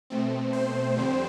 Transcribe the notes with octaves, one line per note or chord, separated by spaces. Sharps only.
B2 A3 C4
C5
F2 D3 G3 C4